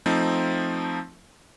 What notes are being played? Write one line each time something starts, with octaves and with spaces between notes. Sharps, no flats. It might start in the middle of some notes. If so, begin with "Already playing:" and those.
F3 A3 C4 D#4